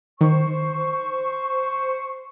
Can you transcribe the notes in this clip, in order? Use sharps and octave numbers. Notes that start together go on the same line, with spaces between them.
D#3 C5 C#6